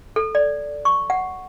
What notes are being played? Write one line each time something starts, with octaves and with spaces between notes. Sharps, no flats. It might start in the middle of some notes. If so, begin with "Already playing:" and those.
A4
D5
C#6
F#5